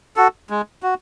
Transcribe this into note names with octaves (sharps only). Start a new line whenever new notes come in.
F#4 A4
G#3
F#4